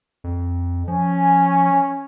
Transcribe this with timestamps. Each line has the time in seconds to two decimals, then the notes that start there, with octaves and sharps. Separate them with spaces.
0.24 F2
0.88 F3 C#4 G#5